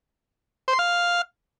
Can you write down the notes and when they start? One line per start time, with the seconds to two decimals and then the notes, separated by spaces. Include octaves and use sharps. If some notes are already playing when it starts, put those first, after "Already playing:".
0.68 C5
0.73 C6
0.79 F5